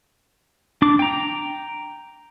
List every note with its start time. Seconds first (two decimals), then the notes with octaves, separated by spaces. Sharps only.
0.82 D4 D6
0.99 G5 A#5